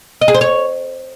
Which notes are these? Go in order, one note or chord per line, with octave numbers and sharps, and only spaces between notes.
D#5
G#4
C5
C#5